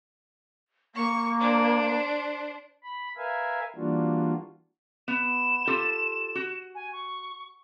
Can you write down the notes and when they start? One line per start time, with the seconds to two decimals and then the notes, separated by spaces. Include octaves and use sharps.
0.95 A#3 C#6
1.38 D4 C5
2.83 B5
3.17 A#4 B4 E5 F5 G#5
3.76 E3 G3 A#3 D4 F4 F#4
5.08 B3 E7
5.67 F4 G4 A4
6.35 F#4
6.75 G#5
6.92 C#6